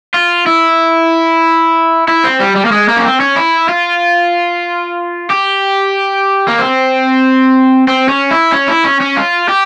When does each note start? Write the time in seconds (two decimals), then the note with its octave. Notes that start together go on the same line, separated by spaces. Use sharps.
0.14 F4
0.46 E4
2.08 E4
2.24 C4
2.40 G3
2.56 G3
2.65 A#3
2.72 G#3
2.89 A#3
2.97 C#4
3.05 C4
3.20 C#4
3.36 E4
3.69 F4
5.30 G4
6.48 A#3
6.59 C4
7.88 C4
8.09 C#4
8.31 E4
8.53 C#4
8.68 E4
8.85 C#4
9.01 C#4
9.17 F4
9.49 G4